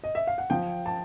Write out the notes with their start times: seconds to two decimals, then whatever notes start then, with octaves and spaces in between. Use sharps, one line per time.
0.04 D#5
0.15 E5
0.27 F5
0.38 F#5
0.50 F3 G5
0.86 A5